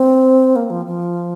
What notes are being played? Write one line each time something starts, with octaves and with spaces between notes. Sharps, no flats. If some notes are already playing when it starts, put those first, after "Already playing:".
Already playing: C4
A#3
F3
F3